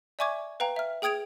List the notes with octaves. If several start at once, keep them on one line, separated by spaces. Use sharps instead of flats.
D5 E5 G#5 C#6 D6 G#6
B4 F5 G5 A#5
E5 F6
G#4 G5 D#6 G#6 D7 F7